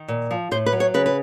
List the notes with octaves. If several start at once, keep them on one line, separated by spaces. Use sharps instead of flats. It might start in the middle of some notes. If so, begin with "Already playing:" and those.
Already playing: D#3
A#2
F3
A2 C5
B4
F#3
C#5
C#3 B4
B4